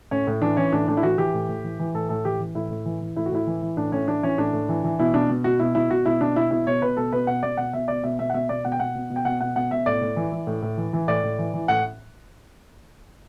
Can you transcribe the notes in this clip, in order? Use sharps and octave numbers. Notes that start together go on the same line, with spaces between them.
A2 C#4
A2
E3 D4
E3 C#4
A2 D4
A2 D4
E4
E3 F#4
E3 G4
A2
A2
E3
E3
A2 A4
A2 A4
E3 G4
E3
A2 E4
A2
E3
E3
A2 E4
F#4
A2 E4
E3
E3
A2 D4
A2 C#4
E3 D4
E3 C#4
A2 D4
A2
E3
E3
B2 E4
B2 D4
B2
B2 F#4
B2 E4
B2 E4
B2 F#4
B2 E4
B2 D4
B2 E4
B2 E4
B2 C#5
B2 B4
B2 A4
B2 B4
B2 F#5
B2 D5
B2 F#5
B2 E5
B2 D5
B2 E5
B2 E5
F#5
B2 E5
B2 D5
B2 F#5
G5
B2 F#5
B2
B2
G5
B2 F#5
B2 F#5
B2 F#5
B2 E5
A2 D5
A2
E3
E3
A2
A2
E3
E3
A2 D5
A2
E3
E3
A2 F#5